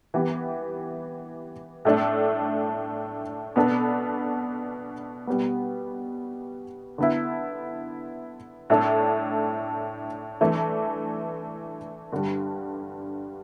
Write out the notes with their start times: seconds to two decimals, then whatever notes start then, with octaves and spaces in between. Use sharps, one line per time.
0.14 E3 B3 G4
1.85 A2 A3 D4
3.56 B2 B3 D4 A4
5.27 B2 G3 B3
6.98 D3 B3 E4
8.70 A2 A3 D4 A4
10.41 E3 A3 D4
12.12 G2 D3 G3